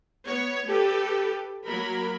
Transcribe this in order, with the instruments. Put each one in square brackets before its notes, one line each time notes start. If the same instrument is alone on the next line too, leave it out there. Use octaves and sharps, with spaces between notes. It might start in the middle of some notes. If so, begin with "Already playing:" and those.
[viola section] B3 C#5
G4 A4 B4
F#3 A#3 A#4 B5